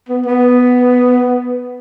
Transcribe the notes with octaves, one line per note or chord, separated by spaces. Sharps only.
B3
B3